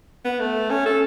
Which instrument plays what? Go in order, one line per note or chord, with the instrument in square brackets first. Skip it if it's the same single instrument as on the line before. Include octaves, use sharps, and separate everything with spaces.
[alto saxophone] B3
A3
C#4
A4